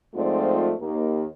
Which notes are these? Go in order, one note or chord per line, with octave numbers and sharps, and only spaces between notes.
G#2 F3 A3 C4 F4 D5
D#2 A#3